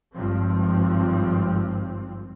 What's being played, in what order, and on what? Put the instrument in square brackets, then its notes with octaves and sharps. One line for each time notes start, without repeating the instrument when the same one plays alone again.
[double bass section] G#1 G2 F3 C4